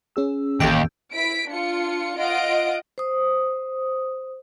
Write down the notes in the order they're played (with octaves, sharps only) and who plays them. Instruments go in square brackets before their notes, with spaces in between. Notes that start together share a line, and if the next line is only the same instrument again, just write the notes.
[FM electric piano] C#4 G#4 E6
[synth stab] A1 G5 [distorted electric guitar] D#2
[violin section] E4 B6 D7
D4 F4 C#7
F4 D#5 F#5 D7
[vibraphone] C5 D#6